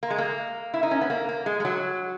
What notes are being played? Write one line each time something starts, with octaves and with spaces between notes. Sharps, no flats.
A#3
G#3
A#3
E4
D#4
C#4
B3
A#3
A#3
G#3
G#3
F#3